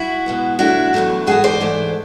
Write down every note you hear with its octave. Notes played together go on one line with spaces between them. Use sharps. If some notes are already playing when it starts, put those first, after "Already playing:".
Already playing: E4 F#4
B2 G#3 B3
E2 B2 F#3 A3 D4 E4 F#4
E2 B2 F#3 A3 D4
G#2 E3 A3 F#4 G#4
C5 D5
G#2 E3 A3